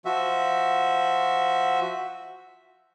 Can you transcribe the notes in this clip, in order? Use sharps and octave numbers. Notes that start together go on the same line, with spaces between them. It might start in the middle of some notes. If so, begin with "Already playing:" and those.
F3 F#4 E5